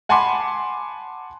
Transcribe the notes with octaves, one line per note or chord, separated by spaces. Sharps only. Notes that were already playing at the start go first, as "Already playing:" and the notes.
F#5 G#5 A5 B5 C6 D6